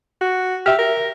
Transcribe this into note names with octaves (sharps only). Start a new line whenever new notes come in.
F#4
G4 E5 F6
A#4